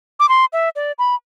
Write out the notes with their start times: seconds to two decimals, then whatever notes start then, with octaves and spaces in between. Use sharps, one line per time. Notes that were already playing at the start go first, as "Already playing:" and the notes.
0.20 D6
0.29 C6
0.53 E5
0.76 D5
0.99 B5